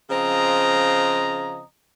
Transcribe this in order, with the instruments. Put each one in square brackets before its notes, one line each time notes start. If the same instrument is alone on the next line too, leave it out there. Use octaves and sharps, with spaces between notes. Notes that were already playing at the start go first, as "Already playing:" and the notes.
[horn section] C#3 F3 C4 D#5 A#5